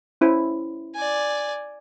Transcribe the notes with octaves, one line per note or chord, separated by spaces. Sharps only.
C#4 E4 C5
D5 G#5